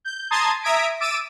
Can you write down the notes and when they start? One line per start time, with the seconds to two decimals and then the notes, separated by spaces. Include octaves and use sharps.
0.04 G6
0.31 A5 A#5 C6 D#6 G#6 A6
0.63 E5 A#5 D#6 G#6 B6 D7
1.00 D6 E6 A6 D7 D#7